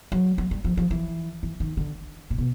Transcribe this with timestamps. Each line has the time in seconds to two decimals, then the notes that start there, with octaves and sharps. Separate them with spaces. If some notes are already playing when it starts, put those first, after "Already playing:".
0.12 F#3
0.38 F#3
0.51 G3
0.64 F3
0.77 F3
0.91 E3
1.43 E3
1.60 D#3
1.77 D3
2.30 A#2
2.38 B2